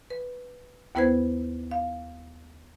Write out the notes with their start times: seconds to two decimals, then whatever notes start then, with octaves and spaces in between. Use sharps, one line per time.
0.10 B4
0.95 D#2 B3 E4 B4 C5 G#6
1.71 F5